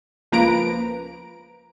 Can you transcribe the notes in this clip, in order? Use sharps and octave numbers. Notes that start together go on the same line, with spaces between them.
C#2 F3 A#3 B4 A#5 D7